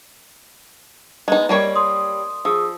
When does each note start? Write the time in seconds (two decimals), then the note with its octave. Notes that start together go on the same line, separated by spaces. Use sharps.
1.28 G#3 B3 D#4
1.49 G3 A#3 C#5
1.76 C6 D#6
2.45 F3 G#4 D#6 E6